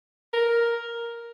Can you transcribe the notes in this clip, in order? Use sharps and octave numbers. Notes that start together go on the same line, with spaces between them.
A#4